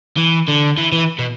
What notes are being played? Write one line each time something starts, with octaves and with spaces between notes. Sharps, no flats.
E3
D3
E3
E3
B2